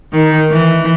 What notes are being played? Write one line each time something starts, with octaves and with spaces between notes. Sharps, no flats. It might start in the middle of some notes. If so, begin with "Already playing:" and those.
D#3
E3